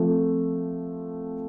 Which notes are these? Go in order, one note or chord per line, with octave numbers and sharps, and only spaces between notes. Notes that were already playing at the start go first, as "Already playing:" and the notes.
Already playing: F3 A3 C4 F4